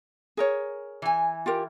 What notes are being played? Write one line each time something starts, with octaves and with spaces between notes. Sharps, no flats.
G#4 A#4 C#5
E3 G#5
F4 G4 A#4